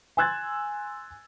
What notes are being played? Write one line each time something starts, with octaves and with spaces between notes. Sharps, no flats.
G#5 C6 E6 F#6 G#6 A6